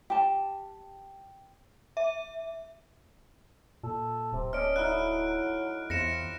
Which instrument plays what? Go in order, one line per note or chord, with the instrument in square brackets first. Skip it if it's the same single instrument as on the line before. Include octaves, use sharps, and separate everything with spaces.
[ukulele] G4 A5
[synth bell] E5
[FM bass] A#2 [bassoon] A4
[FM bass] D1 [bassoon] C3
[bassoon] C#4 [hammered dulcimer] A4 D5 D#5 [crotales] F6 D7
[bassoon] F#3 [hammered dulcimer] D#4 E4 C#5 [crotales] F6 F#6
[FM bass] E2 [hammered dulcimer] C3 F4 [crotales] A#6 C#7 E7